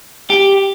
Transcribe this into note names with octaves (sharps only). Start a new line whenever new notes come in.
G4